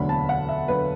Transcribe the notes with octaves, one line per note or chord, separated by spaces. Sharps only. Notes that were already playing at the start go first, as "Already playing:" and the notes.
Already playing: E1 D2 D3 F#3 B5
A5
F#5
E5
D3 F#3 B4